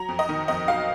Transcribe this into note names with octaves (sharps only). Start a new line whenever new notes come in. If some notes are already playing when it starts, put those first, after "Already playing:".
Already playing: F#3 A#5
F2
D#5
D#3
F2 D#5
F#3 F5